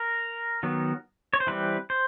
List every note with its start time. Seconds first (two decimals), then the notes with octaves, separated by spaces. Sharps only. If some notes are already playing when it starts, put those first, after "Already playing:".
Already playing: A#4
0.63 D#3 F#3 B3
1.33 C#5
1.40 C5
1.47 E3 G3 C4 B4
1.90 C5